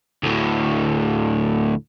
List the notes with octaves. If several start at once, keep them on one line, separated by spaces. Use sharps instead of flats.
D2 A2